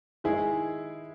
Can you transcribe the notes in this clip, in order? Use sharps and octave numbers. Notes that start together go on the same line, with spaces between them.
D#3 G#3 E4 G#4